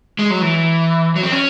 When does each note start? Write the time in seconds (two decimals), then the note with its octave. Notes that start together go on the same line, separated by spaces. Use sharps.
0.19 G#3
0.30 F#3
0.41 E3
1.16 F#3
1.23 C4
1.32 C#4